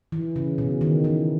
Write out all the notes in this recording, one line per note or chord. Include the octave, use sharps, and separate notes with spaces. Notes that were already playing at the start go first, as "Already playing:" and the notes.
E3
C#3
B2
D#3
E3